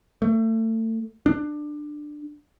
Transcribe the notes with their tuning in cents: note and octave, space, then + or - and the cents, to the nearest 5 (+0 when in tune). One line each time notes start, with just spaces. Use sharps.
A3 +30
D4 +15